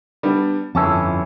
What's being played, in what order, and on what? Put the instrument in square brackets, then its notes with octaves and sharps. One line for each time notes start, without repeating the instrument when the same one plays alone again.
[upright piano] G3 B3 D4
[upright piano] G1 A5 [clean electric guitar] F2 C#4 E4